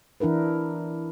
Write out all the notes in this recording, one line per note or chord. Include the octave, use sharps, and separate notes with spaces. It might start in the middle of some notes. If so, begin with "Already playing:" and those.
E3 D4 E4 A#4 B4